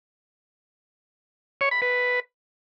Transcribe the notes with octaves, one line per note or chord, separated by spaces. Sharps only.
C#5
B5
B4